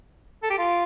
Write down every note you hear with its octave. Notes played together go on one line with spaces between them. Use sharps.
A4
G4
F4